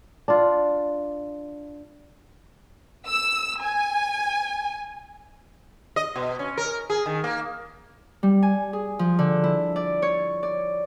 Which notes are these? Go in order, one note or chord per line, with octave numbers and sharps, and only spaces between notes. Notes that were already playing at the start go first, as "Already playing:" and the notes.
D4 F4
E6
G#5
D#5
B2
C#4
A#4
G#4
D#3
A#3
G3
G#5
G#4
F3
D3
E4
D5
C#5
D5